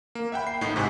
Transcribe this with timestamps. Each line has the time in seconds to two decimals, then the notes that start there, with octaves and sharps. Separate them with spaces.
0.15 A#3
0.32 E5 F#5 G5 B5
0.47 C7
0.61 A1 A2 D#4 C7
0.76 G#2 C3 G#5 F#6 B6